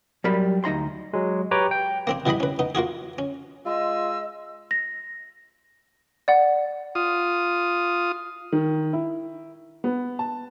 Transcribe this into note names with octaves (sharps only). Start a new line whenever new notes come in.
F#3 G3 A#4 B5
D2 D#4 A#5 C6
F#3 G#3
G4 B4 C#5 G5 A#5 D6
G5
A#3 C4 D4
B2 E3 G3 D#5 B5
C#4 B4
B3 D#4
A#3 F4 F#4 G#4
C#4
G#3 F4 D#5 E6
A#6
D5 F#5
F4 D#6
D#3
E4
B3
A5